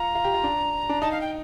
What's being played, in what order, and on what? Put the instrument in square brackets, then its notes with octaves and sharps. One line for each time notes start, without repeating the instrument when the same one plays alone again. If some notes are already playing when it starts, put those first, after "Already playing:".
Already playing: [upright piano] F4 [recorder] A#5
[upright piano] F4
G4
F4
D4
D4
[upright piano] D#4 [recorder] A5
[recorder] F5
G5